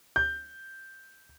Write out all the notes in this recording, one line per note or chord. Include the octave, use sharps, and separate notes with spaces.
G6